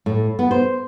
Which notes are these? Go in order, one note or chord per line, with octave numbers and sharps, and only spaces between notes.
A2
B3
C5